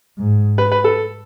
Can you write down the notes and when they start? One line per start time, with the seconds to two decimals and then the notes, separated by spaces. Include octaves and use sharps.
0.18 G#2
0.58 B4
0.72 B4
0.84 A4